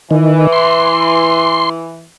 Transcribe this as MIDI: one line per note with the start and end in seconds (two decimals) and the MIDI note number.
0.11 0.47 51
0.11 2.04 52
0.52 1.69 84